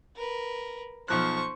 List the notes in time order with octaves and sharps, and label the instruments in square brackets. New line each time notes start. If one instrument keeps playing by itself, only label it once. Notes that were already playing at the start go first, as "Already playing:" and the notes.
[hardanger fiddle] A#4 B4
[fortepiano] B1 F3 F#6 [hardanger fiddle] C5 C#6